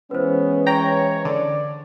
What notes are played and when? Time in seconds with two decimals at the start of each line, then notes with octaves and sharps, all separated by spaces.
0.11 E3 G#3 B3 C#4 B4 C5
0.66 C#5 G5 A#5
1.25 D3 D5